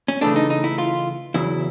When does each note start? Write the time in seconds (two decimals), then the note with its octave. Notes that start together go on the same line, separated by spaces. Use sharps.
0.08 C#4
0.21 C#3 E3 A3 D4
0.36 D#4
0.50 D#4
0.64 E4
0.78 F4
1.34 E2 C#3 F#3 E4